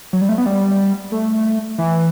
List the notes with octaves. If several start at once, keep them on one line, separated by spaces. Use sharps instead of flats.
F#3
G3
A3
B3
G3
A3
E3